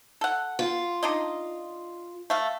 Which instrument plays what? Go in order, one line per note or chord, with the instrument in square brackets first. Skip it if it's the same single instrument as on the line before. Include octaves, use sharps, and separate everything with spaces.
[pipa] A4 F#5
[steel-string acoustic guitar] F4
[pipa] D4 D#4 D#5
A3 F5